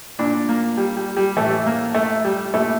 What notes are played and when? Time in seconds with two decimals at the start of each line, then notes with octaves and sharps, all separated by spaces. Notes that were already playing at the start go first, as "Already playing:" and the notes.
0.19 A#2 D4
0.49 A#3
0.77 G3
0.97 G3
1.17 G3
1.37 A2 E3 A3
1.66 A#3
1.95 A3
2.25 G3
2.54 A#2 A3